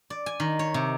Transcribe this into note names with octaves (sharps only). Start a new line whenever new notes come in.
D5
G#5
D#3
C#5
C3